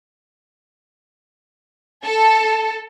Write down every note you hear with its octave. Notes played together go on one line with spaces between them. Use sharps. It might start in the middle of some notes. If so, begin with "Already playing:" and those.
A4